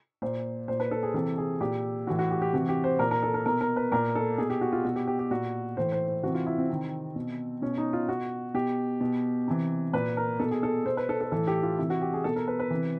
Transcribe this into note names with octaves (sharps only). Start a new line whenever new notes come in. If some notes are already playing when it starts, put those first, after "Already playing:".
A#2 C5
A#2 C5
B4
A4
G#4
C3 E3 A4
G#4
A#2 G4
A2 E3 F#4
F#4
G4
G4
C3 E3 F#4
G4
C5
A#2 A#4
A#4
A4
A#4
B2 A#4
A#4
B4
A#2 A#4
A4
B2 G#4
G4
F#4
F4
B2 F#4
G4
G4
G4
A#2 F#4
A2 E3 C5
C5
C5
C3 E3 F#4
F4
E4
C4
C3 D#3
B2
B2 C#4
D#4
F4
B2 F#4
B2 G4
B2
C3 E3
A#2 B4
A#4
B2 A4
G#4
A4
B2 C5
B4
A4
A4
A2 E3 A4
G4
F4
C3 E3 E4
F#4
G4
G#4
B2 A4
A#4
B4
B4
C3 E3